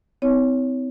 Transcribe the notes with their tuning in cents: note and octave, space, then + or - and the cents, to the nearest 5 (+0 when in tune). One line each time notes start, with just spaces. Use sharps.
C4 -25 E4 -35 C#5 +10